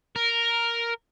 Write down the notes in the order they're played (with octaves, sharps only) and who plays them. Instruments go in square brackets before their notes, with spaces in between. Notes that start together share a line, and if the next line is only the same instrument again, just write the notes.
[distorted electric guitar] A#4